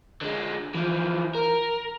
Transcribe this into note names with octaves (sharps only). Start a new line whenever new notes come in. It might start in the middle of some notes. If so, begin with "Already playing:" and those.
D3 G#3
E3 F3
A#4